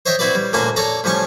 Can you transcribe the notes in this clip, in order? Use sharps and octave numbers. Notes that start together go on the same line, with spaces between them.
C5 C#5 D#5 E5 G5
C4 E4 F#4 B4 D5
G3
D2 A#2 A#3 C#4 F#4 G#5
A4 C#5 D5 A#5
A2 F3 G3 C#4 G#5 C#6